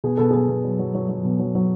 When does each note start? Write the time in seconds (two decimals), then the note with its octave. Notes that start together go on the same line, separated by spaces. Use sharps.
0.04 B2 G#4
0.17 B2 A4
0.31 B2 G#4
0.49 B2
0.64 F#3
0.79 F#3
0.95 F#3
1.09 F#3
1.25 B2
1.39 F#3
1.55 F#3